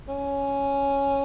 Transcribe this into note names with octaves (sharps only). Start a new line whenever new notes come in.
C#4